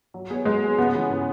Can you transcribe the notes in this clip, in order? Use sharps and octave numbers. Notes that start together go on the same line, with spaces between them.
F#3
B3 G#4 C#5
F#3 G#3
B3 G#4 C#5
C#3 B3
E3 G#3 C#4
C#3